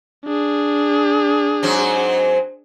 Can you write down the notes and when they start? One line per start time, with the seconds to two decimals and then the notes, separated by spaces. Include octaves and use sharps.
0.25 D4 G#4
1.63 G#2 F#3 C4